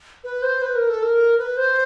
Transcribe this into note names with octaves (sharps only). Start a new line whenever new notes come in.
B4
C5
B4
A#4
A4
A#4
B4
C5